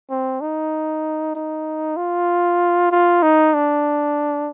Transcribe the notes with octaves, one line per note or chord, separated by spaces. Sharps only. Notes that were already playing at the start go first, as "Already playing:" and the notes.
C4
D#4
D#4
F4
F4
D#4
D4